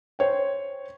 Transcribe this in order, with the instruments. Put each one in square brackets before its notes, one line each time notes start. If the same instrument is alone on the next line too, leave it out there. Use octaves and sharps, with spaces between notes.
[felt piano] C5 C#5 G5